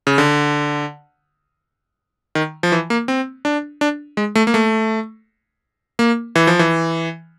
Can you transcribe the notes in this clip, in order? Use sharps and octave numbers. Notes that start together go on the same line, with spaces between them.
C#3
D3
D#3
F3
E3
A#3
C4
D4
D4
G#3
A3
A#3
A3
A#3
E3
F3
E3